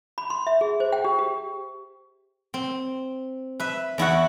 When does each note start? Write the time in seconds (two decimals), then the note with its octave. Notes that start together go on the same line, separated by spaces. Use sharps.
0.18 B5
0.30 C6
0.47 E5
0.61 G#4
0.80 C5
0.92 G5
1.05 G4
1.19 G4
2.54 C4
3.60 B4 E5
3.98 E2 E4 F#4 F#5